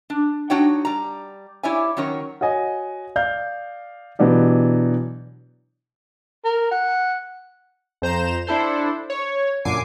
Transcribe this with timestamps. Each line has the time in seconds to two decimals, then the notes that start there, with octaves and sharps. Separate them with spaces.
0.10 D4
0.50 D4 D#4 F#4 C#5 F#5 G5
0.85 G3 A#5
1.63 E4 G4 C#5 D5 E5 G#5
1.97 D#3 F#3 C#4 A#4 C#5
2.41 F#4 C#5 D#5 G#5
3.16 D5 F5 G6
4.19 B2 E3 F#3 D4 G4
6.45 A#4
6.71 F#5
8.02 F2 C5 A#5 E7
8.47 D4 E4 A4 C5
9.10 C#5
9.65 F#2 A#2 D3 G#5 D6 C7